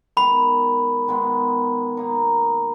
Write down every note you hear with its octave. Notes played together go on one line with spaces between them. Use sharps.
D#3 G#3 B3 B5
D#3 G#3 B3
B2 A#3 D#4